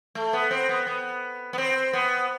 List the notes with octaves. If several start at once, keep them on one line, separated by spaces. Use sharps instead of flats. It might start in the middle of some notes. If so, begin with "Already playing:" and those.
A3
B3
C4
B3
B3
B3
C4
B3